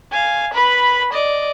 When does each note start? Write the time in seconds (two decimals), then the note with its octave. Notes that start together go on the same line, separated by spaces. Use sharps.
0.11 F5 G#5
0.54 B4 B5
1.13 D5 D#5